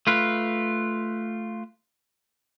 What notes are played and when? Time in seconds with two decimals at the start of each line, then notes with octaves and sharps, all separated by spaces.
0.07 A3 F4 B4